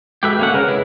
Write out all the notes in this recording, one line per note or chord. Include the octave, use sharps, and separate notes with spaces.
G#3 F#4 G4 A4 B4 E5
A#3 C#4 F#5 D6
C#3 G#3 G#4 A#4 B4 C#5
E4